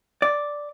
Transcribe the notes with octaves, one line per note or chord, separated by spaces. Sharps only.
D5